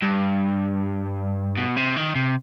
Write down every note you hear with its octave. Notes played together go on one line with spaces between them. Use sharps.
G2
B2
C3
D#3
C3